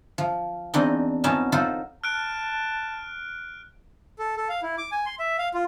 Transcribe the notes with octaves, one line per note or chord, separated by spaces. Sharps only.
F3
E2 C4 D4 D#4 D#5
F2 B3 C#4 D#4 A5
D#4 F4 A4 C5 F#5
A5 F6 F#6 D7
A4
A4
F5
E4
D6
G#5
C6
E5
F5
F4